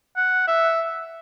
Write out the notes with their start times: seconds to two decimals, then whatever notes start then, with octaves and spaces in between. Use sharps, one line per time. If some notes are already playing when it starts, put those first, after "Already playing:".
0.16 F#5
0.47 E5